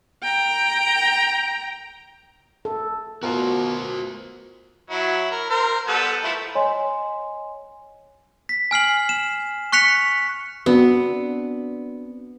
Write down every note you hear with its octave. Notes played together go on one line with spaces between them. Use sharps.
G5 A#5
A4
B2 F4 F#4 A#4 C5
F#3 E4
A#4
A#4 C5
G3 B3 A4
F3 A3 E4
C#5 D#5 G#5 C6
B6
G#5 F6 C7 F#7
E7
C#6 F#6 B6 C#7 F7
B3 C4 D4 F#4